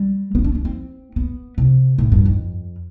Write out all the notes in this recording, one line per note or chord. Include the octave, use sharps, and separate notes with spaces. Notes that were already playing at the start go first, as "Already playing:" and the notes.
Already playing: G3
B3
D4
D4
C4
B3
C3
A2
G2
F2